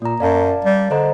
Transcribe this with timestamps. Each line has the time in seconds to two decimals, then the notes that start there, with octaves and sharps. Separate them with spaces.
0.02 A#2 A#3 A#5
0.20 F#2 D5 F5 A5
0.65 G3
0.91 D3 C5 D#5 A#5